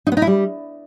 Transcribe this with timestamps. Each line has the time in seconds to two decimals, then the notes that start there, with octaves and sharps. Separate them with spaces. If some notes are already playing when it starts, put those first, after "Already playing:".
0.07 D#4
0.12 B3
0.17 D#4
0.22 E4
0.27 G3